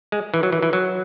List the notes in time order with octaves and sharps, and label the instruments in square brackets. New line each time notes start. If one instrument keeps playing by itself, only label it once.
[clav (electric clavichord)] G#3
E3
F#3
E3
E3
F#3